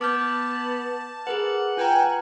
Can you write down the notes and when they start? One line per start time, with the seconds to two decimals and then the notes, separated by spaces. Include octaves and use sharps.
0.01 B3 A5 D6 F6 G6
1.27 G#4 A#4 B4 F#5
1.77 F4 B4 G5 G#5 A#5